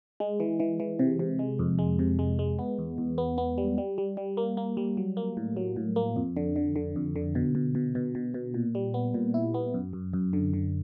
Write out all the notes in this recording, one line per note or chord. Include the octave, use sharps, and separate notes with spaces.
G#3
E3
E3
E3
C3
C3
G#3
F2
G#3
C3
G#3
G#3
B3
E2
E2
B3
B3
G3
G3
G3
G3
A#3
A#3
G3
F#3
A#3
A2
F#3
A2
A#3
F2
D3
D3
D3
F2
D3
B2
B2
B2
B2
B2
B2
A#2
G3
B3
A#2
E4
B3
F#2
F#2
F#2
D3
D3